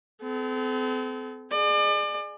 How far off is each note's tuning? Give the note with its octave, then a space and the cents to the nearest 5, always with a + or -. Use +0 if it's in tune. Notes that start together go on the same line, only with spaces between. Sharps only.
C4 -40 A4 -40
G#4 +5 D5 +35